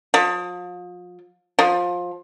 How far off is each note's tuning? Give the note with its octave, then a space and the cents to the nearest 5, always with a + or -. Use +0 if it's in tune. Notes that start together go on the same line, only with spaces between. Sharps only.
F3 +35
F3 +20